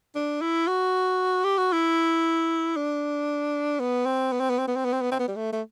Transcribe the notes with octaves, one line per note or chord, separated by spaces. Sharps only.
D4
E4
F#4
G4
F#4
E4
D4
B3
C4
B3
C4
B3
C4
B3
C4
B3
C4
B3
C4
B3
G3
A3
A3